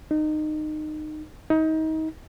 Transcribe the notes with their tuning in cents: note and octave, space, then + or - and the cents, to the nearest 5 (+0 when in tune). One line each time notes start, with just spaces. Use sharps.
D#4 -25
D#4 +25